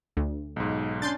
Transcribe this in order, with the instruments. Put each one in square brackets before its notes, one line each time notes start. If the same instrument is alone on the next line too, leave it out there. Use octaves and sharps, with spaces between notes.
[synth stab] D2
[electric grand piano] B1 G#2
[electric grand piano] C#4 D4 [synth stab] C6 G6 A6